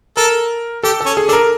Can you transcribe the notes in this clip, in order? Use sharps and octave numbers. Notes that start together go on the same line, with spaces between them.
A4 A#4
G4 A4
A4
C#4
G#4
D4 A4
A#4